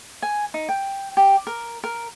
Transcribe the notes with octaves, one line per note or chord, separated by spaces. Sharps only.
G#5
D#4
G5
G4
A#4
A#4